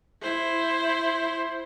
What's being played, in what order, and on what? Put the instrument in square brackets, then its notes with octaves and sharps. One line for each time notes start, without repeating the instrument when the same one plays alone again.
[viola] E4 C5